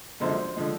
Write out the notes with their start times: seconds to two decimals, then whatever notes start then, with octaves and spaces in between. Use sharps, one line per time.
0.20 F#2 D3 F3 G#3 C5
0.56 D3 F3 G#3